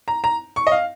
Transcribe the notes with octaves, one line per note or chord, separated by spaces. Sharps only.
A#5
A#5
C#6
D#5
F5